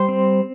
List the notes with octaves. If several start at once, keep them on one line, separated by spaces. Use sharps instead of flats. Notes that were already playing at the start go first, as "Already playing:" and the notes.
Already playing: G3 C5 C6
C4